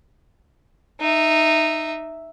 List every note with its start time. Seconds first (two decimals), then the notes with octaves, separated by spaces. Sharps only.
1.01 D#4 E5